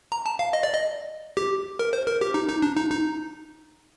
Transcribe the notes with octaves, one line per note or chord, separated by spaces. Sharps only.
A#5
A5
F5
D#5
D5
D#5
G4
A#4
C5
A#4
G4
D#4
D#4
D4
D#4
D#4